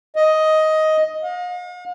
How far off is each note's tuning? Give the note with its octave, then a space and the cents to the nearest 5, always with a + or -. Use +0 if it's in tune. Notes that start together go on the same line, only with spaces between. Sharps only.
D#5 +10
F5 +45